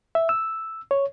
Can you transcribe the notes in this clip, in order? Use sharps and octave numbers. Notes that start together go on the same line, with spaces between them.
E5
E6
C#5